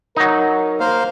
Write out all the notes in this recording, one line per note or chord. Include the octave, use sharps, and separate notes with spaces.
F#3 D#4 A#4
A#3 C5 F5